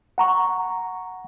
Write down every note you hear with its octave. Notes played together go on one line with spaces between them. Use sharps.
F#5 A#5 C#6